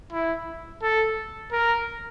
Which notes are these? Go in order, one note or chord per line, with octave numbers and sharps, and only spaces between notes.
E4
A4
A#4